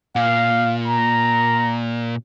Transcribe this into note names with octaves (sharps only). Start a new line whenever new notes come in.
A#2 F5
A#5